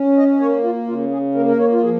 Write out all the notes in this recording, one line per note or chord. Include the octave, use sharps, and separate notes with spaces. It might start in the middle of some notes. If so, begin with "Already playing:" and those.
Already playing: C#4
D#5
A#3 C#5
F4
C#3 F4
G#4
A#3 A#4
A#4
C#5
F4
F3 G#4